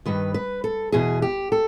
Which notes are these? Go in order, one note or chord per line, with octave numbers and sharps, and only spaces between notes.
G2 D#3 B4
B4
A4
E2 B2 G#4
G4
A4